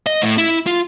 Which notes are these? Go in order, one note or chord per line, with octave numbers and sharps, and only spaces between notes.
D#5
A2
E4
F4